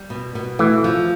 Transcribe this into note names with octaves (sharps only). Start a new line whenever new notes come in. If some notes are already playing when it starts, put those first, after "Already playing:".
Already playing: G3
B2
B2
E3 A3
F3